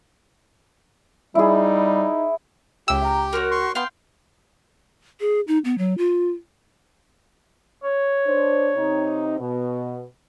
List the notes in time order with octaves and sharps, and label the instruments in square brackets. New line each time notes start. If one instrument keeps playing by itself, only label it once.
[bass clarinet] G3 [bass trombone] D#4 [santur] E4 G#4
[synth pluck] C#2 E6 [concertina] G4 G5 [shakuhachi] E5
[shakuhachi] A#5
[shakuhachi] F#4 [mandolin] A#4 C5 C#5
[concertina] C6 C#6
[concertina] B3 [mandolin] F5 G5 C6
[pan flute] G#4
D#4
B3
F#3
F4
[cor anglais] C#5
[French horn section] D4 C5
C3 C4 D#4
B2